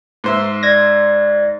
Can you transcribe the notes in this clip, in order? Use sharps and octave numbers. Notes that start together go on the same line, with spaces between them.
G#2 C5 E5
D5 G#6 A#6